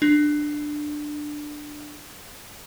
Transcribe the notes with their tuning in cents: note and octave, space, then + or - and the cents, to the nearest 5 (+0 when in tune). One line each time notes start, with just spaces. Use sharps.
D4 +15